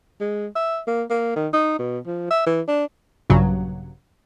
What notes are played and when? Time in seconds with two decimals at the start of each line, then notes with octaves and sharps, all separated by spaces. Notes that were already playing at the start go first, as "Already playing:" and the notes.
0.21 G#3
0.56 E5
0.87 A#3
1.10 A#3
1.36 D#3
1.53 D#4
1.79 B2
2.06 F3
2.31 E5
2.47 E3
2.68 D4
3.30 A#1 G2 C#3 F#3